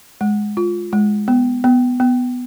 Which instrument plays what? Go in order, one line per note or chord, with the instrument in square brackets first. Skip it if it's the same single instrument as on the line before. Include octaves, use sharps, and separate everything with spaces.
[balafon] G#3
F4
G#3
B3
B3
B3